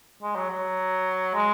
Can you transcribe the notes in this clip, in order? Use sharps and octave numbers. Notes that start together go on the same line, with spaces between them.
G#3
F#3
F#3
G#3